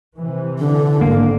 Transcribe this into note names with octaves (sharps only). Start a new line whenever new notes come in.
C3 E3
D3
G#1 A#3